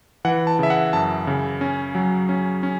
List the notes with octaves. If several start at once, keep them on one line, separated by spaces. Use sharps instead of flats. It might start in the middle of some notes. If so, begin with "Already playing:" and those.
E3 F#5
A5
C#3 E5
F#5
F#2 A5
C#3
C#4
F#3
C#4
C#4